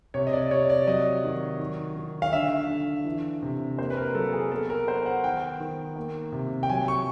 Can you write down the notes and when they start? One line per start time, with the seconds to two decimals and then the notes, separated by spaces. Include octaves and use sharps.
0.14 C3 C#5
0.27 D#5
0.33 D5
0.51 C3 C#5
0.69 D5
0.87 F#3 D#5
1.24 D#3
1.59 D#3
1.97 D#3
2.22 F5
2.33 D3 E5
2.69 D3
3.05 E3
3.43 C3
3.78 A#3 C5
3.90 B4
3.97 A#4
4.15 F#3 A4
4.33 G#4
4.51 B3 A4
4.70 A#4
4.88 B3 C5
5.06 F#5
5.24 D#3 G5
5.60 D#3
5.96 A#3
6.32 C3
6.63 G5
6.69 F#3 G#5
6.88 C#6